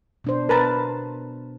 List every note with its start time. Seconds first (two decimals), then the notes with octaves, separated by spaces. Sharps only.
0.24 B2 D4 C5
0.49 A#4 B4 A5